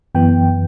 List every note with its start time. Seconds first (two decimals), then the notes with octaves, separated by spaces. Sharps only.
0.15 F#2 E3 B3 G5